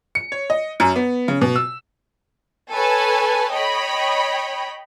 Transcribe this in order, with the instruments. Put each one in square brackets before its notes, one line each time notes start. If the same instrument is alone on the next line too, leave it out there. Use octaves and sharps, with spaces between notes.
[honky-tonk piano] C#7
C#5
D#5
F#2
B3
C#3
B2
E6
[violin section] A4 B4 C#5 G#5 A5
C#5 D#5 G5 B5